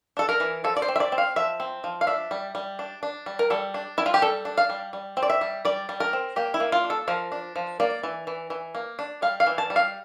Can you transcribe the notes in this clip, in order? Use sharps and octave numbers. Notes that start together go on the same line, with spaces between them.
D4 A4
A#4
E3
F3 A4
D5
C5
C4
E5
D5
C4
F5
F3 E5
C4
F3
F5
D4 E5
G3
G3
D4
D4
G3
A#4
G3 A4
D4
G3 E4
F4
G4
G3 A4
D4
F5
G3
G3
C4
D5
E5
G3
G3 D5
G3
A#4
C4
A#3 G4
E4
A#3
F4
D4
A4
F3 A#4
D4
F3
A#3 D5
E3
E3
E3
A#3
D4
G3 F5
F5
E3
A5
G3
F5